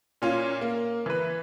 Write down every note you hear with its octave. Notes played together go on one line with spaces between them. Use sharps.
A#2 C#4 F4
A#3
E3 B4